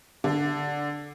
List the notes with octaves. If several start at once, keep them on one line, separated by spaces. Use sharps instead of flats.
D3